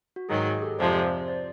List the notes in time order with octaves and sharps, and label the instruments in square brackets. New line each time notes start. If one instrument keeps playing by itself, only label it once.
[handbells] F#4
[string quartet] G#2 D#3 F#3 [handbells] G#4
[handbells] G#4
G4 A4
[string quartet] F2 C3 F3 G#3 [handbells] C5 D5
[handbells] C5 D5